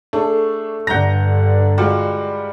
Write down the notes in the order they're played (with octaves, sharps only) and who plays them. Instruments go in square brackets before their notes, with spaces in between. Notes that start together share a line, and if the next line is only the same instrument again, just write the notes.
[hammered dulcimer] A3 [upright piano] D4 G#4
[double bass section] G2 D3 [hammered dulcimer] F#5 A#5 [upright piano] G6 A#6
[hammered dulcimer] G3 [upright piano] G#3 F4 F#4